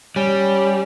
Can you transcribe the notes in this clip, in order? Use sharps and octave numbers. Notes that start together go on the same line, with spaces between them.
G3 C#4